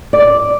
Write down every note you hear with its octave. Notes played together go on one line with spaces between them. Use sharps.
D5